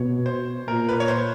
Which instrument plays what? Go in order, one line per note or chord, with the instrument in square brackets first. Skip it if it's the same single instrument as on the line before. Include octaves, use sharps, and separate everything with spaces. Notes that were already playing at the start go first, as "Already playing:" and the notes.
Already playing: [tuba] B2 [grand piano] C#5
[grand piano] C5
[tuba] A#2 [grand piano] A#4
[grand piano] B4
C#5
C5